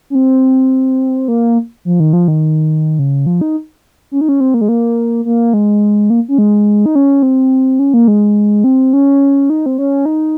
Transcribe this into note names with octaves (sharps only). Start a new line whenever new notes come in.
C#4
C4
A#3
F3
D#3
F3
D#3
C#3
F3
D#4
C#4
D#4
C#4
C4
A#3
G#3
A#3
A#3
G#3
A#3
C#4
G#3
D#4
C#4
C4
C#4
A#3
G#3
C4
C#4
D#4
C4
C#4
D#4